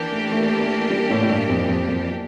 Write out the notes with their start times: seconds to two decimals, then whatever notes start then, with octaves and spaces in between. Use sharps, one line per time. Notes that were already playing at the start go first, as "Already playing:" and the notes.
Already playing: E3 A#3 D4 G4
0.12 A3
0.32 A3
0.61 A3
0.90 G3
1.10 A2
1.22 A2
1.30 G2
1.49 F2
1.69 F2
1.89 F2